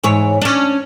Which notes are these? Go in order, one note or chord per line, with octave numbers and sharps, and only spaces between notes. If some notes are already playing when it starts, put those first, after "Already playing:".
G#2 E3 C#5
C#4 D4